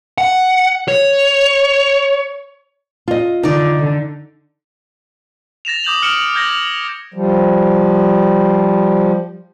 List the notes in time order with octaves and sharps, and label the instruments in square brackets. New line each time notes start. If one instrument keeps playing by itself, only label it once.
[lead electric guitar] F#5
C#5
[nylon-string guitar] F4 D#5
[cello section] D3 [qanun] D#4 D5
[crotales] A6 A#6 E7 F7
D6 D#6 G6 E7 F#7
D#6 F6 C#7 D7 E7 F#7
F6 G6 G#6 A#6
[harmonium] F3 G3